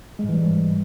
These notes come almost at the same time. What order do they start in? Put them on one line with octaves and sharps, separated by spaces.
G#3 G#2 E3 G3